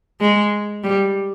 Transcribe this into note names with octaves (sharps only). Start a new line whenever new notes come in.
G#3
G3